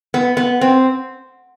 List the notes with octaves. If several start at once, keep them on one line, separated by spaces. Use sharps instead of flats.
B3
B3
C4